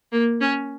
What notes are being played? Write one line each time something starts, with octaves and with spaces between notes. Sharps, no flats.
A#3
C#4